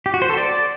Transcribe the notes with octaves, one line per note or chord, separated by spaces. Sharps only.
G4
F#4
C5
A4
D5